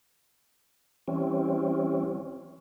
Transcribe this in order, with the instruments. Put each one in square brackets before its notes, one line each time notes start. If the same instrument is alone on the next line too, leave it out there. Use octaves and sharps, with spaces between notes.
[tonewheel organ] E3 G3 C4 C#4